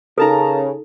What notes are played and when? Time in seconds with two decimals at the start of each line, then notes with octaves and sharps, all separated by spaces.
0.18 C#3 D#4 A4 A#4 A5 A#5